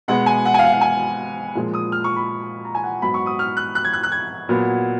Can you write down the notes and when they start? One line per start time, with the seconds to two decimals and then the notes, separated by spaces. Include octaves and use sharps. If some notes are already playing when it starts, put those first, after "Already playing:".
0.08 B2 G#3 B3 F#5
0.26 G#5
0.45 F#5
0.54 G#5
0.59 F5
0.64 F#5
0.73 F5
0.81 G#5
1.55 A#2 F3 G#3
1.74 D#6
1.92 F6
2.04 C#6
2.16 B5
2.65 A#5
2.75 G#5
2.84 F#5
3.02 G#2 F#3 B3 B5
3.14 C#6
3.26 D#6
3.39 F6
3.57 F#6
3.75 F#6
3.84 G#6
3.93 F#6
4.03 F#6
4.12 G#6
4.49 A#2 F#3 B3